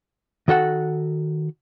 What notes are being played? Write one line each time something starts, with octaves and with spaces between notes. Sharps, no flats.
D#3 F#4 A4 F#5